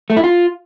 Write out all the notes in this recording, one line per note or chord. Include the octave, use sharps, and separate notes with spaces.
A3
E4
F4